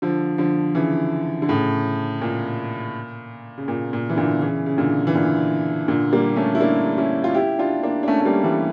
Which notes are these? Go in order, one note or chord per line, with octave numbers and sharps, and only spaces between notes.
D3 F3
D3 F3
C#3 E3
D3
A2 C#3
A#2
C#3
A#2
A#2
E3
A#2 D3
C#3 E3
C#3
A#2 D3
E3
A#2 D3
A#2 D3
G3 A#3
A3 C#4
E4
A#3 D4
C#4 E4
F4
E4 G4
D4 F4
A#3 D4
D4
A3 C#4
A3
G3 A#3
E3 G3